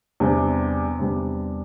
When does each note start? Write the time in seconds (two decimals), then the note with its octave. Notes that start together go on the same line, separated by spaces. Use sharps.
0.20 E2 C3 G3 D4
0.99 E2 C3 G3 D4